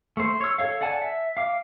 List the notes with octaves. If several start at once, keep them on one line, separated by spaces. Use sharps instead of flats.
A3 C5
C#5 E6
A4 C#5 F5
D5 F#5 G#5 A5
E5
F5 D6